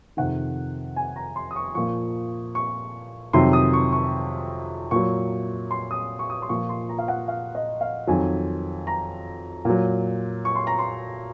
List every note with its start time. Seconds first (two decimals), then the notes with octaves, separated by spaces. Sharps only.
0.17 F2 C3 D#3 F#5
0.96 G#5
1.16 A#5
1.36 C6
1.51 D#6
1.56 C#6
1.75 A#2 F3 C#6
2.55 C#6
3.33 F2 C3 D#3 F#3 C6
3.53 D#6
3.73 C#6
3.92 C#6
4.91 A#2 F#3 C#6
5.71 C6
5.91 D#6
6.19 C#6
6.30 D#6
6.42 C6
6.49 A#2 F3 C#6
6.69 C6
6.89 A#5
6.99 F5
7.08 F#5
7.28 F5
7.55 D#5
7.81 F5
8.07 F2 D#3 F#3 G#5
8.87 A#5
9.65 A#2 F#3
10.45 C#6
10.56 C6
10.67 A#5
10.79 C6